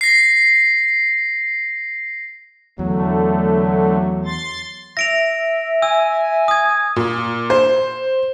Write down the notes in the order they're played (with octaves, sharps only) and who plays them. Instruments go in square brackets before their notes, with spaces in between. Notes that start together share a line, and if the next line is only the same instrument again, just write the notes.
[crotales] A#6 C7
[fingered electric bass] E2 [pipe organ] D3 A3 [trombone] F#3
[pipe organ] C6 A6
[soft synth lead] E5 [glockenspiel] A#6 D7 F7
[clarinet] G#5 [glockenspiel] E6
[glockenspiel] D#6 G#6
[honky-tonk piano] A#2
C5